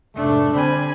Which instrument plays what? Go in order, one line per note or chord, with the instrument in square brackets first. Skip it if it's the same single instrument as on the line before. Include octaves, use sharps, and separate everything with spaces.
[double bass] F1 G#2 [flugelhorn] A3 [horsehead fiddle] D4
[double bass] D3 C4 [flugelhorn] G3 [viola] G#5 B5